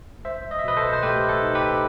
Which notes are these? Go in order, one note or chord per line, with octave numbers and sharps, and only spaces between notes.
C2 C5 E5
D#5
E5
B2 B4 D#5
A4 C5
C5
A3 G4 B4
A4
D#4
G4 B4